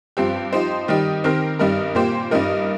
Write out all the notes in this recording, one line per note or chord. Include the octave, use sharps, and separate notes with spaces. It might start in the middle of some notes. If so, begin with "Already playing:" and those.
G2 F3 C4 G4
F3 D#4 G4 C5
D#3 G3 D#4 G4
D#3 C4 G4 A#4
G2 G3 D#4 A#4
A#2 A#3 G4 C5
G2 G3 D#4 A#4